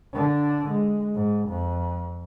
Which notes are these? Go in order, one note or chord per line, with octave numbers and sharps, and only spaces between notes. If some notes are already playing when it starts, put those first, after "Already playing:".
D3 D4
G#3
G#2
F2